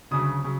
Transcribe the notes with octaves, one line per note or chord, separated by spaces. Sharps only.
D2 C#3 F#3 D#6
C#3 F#3